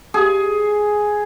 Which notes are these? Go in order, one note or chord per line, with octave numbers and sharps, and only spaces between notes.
G#4